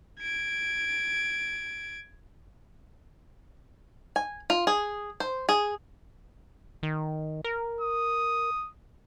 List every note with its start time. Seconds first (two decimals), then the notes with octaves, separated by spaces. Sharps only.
0.20 G#6 D7
4.16 G#5
4.50 F4
4.67 G#4
5.20 C5
5.49 G#4
6.83 D#3
7.44 A#4
7.81 D#6